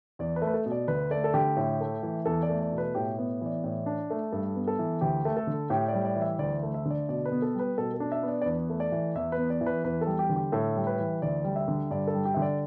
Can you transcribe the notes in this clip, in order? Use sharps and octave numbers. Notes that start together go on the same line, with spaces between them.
E2 D5
B4
A3
B4
A4
B2
D5
D2 B4
A3 D5
A4
D3 G4
A2
A3
E3
E2 A4
D5
A3
D5
B2
B4
A2 G4
B3
E3 D5
A2
D4
A3
G2 A4
B3
A4
E3
D2 G4
A3
A4
D3
A2 G4
D5
G3
D5
E3
E5
D2 D5
A3
E5
D3
D5
B2 D5
B4
B3
A4
G3 B4
B2 A4
A4
D4
E5
B3
D5
D5
E2 B4
A3
D5
E3
E2 E5
B4
B3
D5
E3
B4
E2 B4
G3 A4
G4
D3
G4
A2 A4
G3
B4
E3
D2 D5
G3
E5
D3
G2 D5
A4
G3
G4
D3 E5
D5